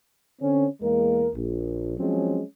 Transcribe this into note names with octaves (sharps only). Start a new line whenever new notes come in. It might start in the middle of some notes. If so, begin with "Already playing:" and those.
D3 C4 C#4
E2 G#3 A#3 A#4
A#1
F3 F#3 G#3 C4 C#4